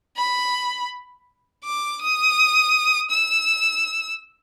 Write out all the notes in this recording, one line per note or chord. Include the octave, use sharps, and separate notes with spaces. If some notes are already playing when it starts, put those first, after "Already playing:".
B5
D6
D#6
E6